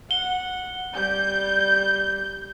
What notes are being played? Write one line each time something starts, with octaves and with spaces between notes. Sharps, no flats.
F#5 G7
G3 G6